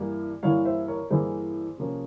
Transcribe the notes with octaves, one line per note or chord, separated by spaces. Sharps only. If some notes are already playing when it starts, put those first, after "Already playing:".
Already playing: G2 E3 G3 A#3 E4
G2 E3 A#3 E4 C#5 F5
C5 E5
A#4 C#5
G2 E3 A#3 E4 G#4 C5
C3 F3 A#3 C#4